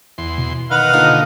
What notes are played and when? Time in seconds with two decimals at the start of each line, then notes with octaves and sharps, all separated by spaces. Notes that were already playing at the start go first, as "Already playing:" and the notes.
0.18 E2 C6
0.38 B2
0.71 D#3 B4 F5 F#5
0.93 D3 D#3 A#3 D#4 F4